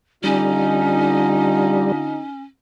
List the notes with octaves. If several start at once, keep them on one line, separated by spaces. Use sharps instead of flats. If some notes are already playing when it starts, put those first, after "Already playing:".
D3 G3 C#4 D#4 F4